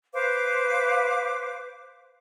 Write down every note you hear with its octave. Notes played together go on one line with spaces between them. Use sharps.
B4 C5 F5 D6